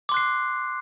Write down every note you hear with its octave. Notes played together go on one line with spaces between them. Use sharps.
C6 D6 F#6 C7